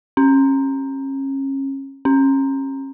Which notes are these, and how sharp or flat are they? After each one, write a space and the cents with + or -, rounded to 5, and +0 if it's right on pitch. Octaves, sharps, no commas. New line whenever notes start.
C#4 -30
C#4 -30